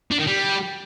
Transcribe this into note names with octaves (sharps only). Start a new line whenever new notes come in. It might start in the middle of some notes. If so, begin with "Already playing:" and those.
D4
D#3
G3